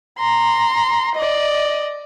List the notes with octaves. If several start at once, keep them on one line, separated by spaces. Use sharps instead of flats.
A#5 C6
D5 D#5